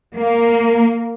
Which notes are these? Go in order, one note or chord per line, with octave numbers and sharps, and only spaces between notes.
A#3